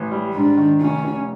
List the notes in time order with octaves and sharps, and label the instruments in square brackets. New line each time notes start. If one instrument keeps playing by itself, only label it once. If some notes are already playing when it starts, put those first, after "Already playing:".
Already playing: [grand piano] A1
G3
[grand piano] G#2 [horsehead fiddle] D4
[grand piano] D#3
[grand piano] F1 [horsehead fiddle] C#4
[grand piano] F1